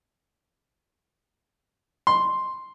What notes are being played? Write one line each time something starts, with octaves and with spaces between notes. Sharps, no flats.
C6